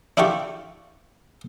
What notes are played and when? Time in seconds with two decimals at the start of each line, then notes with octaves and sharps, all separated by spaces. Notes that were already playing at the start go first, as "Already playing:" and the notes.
0.17 D4 E4 F4 G4 C#6